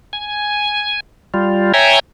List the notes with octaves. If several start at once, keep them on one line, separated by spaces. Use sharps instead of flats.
G#5
G3 F4
C#5 E5 G5 G#5 A#5